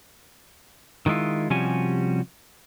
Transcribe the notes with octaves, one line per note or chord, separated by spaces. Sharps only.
D#3 F#3 G#3 E4 F4
C3 F3 G3 C#4 F#4 G#5